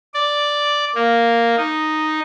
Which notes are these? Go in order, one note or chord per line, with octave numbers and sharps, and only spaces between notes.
D5
A#3
D#4